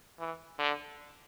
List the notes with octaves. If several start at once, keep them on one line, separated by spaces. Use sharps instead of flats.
E3
D3